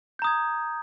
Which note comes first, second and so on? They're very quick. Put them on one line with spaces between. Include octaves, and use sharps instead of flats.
G6 A#5 D#6 G#6